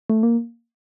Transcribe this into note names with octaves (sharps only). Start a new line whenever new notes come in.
A3
A#3